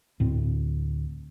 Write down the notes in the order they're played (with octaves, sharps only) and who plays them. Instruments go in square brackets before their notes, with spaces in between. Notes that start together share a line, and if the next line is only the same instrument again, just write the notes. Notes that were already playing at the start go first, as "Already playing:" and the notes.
[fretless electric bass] D2 A2 C4